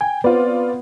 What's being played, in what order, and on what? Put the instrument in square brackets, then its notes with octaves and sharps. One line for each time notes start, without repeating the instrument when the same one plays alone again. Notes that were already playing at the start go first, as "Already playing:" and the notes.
[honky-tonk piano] G5 [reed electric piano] G#5
[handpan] B3 [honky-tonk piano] C4 F4 D5 [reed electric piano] B4